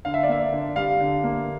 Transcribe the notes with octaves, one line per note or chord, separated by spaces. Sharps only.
D3 F5
E5
D5
A#3 E5
D3
G3 F5
D3
A#3